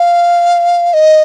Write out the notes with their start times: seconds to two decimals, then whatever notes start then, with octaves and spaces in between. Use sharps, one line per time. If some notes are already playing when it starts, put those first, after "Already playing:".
Already playing: F5
0.94 D#5